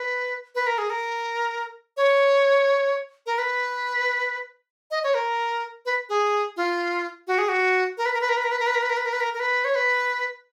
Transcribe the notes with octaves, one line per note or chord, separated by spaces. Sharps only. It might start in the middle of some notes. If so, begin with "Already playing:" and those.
Already playing: B4
B4
A#4
G#4
A#4
C#5
A#4
B4
D#5
C#5
A#4
B4
G#4
F4
F#4
G#4
F#4
A#4
B4
A#4
B4
A#4
B4
A#4
B4
A#4
B4
A#4
B4
A#4
B4
A#4
B4
A#4
A#4
B4
C#5
B4